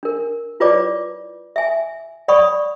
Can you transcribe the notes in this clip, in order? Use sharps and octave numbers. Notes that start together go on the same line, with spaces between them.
D4 A#4
E4 F4 B4 C#5 D5 D6
E5 G#5
C#5 D5 F#5 B5 C#6 D#6